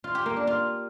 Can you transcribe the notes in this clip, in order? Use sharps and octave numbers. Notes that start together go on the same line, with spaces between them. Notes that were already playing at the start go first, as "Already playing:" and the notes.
F4
G4
A#3
D4
F4